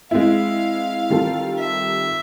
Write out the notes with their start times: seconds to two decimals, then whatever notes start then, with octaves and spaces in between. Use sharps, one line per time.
0.11 G#3 C4 E4 F5
1.10 D#3 G3 C4 F4 A4
1.58 E5